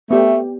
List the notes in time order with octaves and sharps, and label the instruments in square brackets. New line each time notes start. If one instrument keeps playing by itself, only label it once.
[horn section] A3 [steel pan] B3 G4 D5 G5